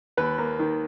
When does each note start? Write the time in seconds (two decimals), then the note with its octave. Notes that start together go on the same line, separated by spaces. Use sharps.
0.17 D#2 B4
0.38 A#3
0.59 D#3